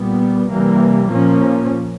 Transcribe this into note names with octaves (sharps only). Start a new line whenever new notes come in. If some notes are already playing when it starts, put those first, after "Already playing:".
Already playing: A#2 G3 B3
C3 E3 G3 A#3
A#2 F3 A#3 C#4